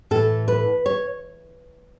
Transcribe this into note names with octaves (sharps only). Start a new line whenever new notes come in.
A2 E3 A4
B4
C#5